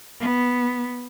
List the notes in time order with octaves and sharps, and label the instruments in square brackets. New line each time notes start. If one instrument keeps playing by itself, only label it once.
[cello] B3